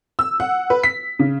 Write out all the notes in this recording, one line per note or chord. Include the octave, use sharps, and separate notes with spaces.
E6
F#5
B4
B6
C#3